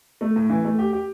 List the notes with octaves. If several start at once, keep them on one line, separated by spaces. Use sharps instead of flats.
A3
A2
E3
A3
G4
G4